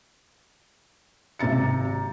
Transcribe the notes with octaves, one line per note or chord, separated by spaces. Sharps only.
G#1 C3 A#5 A6 C#7